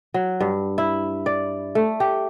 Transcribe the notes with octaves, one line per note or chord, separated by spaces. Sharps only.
F#3
G2
E4
D5
A3
G4